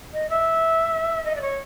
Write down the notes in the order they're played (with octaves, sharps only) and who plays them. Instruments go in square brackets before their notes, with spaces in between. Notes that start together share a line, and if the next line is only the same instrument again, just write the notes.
[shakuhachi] D#5
E5
D#5
D5
C#5